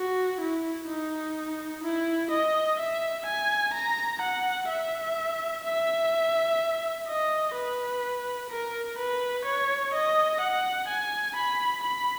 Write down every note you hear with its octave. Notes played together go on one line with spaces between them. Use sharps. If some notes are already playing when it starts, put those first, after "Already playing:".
Already playing: F#4
E4
D#4
E4
D#5
E5
G#5
A#5
F#5
E5
E5
D#5
B4
A#4
B4
C#5
D#5
F#5
G#5
B5
B5